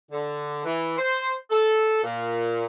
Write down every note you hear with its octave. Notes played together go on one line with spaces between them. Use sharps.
D3
E3
C5
A4
A#2